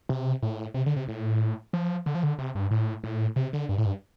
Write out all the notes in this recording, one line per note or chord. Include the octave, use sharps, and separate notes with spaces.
C3
A2
C3
D3
C3
A2
F3
D3
F3
D3
C3
G2
A2
A2
C3
D3
G2
A2
G2